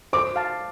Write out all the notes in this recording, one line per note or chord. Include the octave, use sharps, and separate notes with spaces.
C5 D6
F5 A5